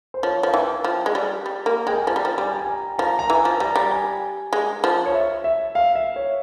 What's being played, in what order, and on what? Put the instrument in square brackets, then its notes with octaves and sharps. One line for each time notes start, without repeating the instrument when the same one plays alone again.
[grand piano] C5
[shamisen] F3 [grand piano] C#5
[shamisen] F3 [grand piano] F5
[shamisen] E3 [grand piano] G5
[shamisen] F3
G#3
G3
G3
A#3
[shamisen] G#3 [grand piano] G5
[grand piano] G#5
[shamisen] F3 [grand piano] A#5
[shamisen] G3
F3
[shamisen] G3 [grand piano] G#5
[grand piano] G5
G#5
A#5
[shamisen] F3 [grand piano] A#5
[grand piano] A#5
[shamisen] E3 [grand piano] G#5
[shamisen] F3
[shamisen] G3 [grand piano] A#5
[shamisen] G3
[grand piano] G#5
[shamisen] G#3
F3
[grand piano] C#5
E5
E5
F5
E5
C#5